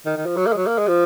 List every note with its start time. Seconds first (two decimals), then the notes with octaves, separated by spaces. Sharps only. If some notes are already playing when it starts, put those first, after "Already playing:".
0.06 D#3
0.17 D#3
0.26 F3
0.37 F#3
0.46 A#3
0.52 G#3
0.57 F#3
0.67 A#3
0.78 G#3
0.88 F3